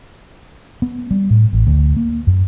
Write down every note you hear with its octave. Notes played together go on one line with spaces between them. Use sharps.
B3
G3
A2
A1
D2
A#3
F#2